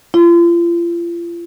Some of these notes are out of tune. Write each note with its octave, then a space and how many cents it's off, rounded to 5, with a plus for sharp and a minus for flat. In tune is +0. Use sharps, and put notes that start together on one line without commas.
F4 -40